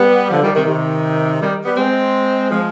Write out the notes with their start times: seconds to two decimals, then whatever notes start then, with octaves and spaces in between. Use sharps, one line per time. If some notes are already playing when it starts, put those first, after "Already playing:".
Already playing: G3 B3
0.30 D3 F3
0.42 D#3 G3
0.55 C3 D#3
0.67 C3 D#3
1.40 D#3 G3
1.65 G3 B3
1.77 G#3 C4
2.50 F3 G#3